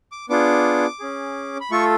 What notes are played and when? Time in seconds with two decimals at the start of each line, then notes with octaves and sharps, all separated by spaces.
0.12 D6
0.29 B3 D4 F4 G#4 D6
1.00 C#4 G#4
1.60 B5
1.71 A3 F4 A4 C#6